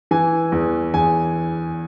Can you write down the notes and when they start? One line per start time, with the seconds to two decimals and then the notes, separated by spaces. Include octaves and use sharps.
0.11 E3 G#5
0.52 E2
0.94 E2 G#5